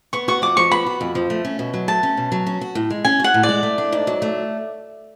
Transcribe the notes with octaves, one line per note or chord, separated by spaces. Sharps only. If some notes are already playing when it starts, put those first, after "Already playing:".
B3 C#6
F#4 C#6
F2 D6
F3 C#6
B3 B5
F#4
F2
F3
A3
C#4
B2
F#3
A3 A5
C#4
B2
F#3
C#4
F#4
A2
G#3
C#4 G#5
F#4 F#5
A2
D5
G#3
A3
D4
G#2
F#3
A3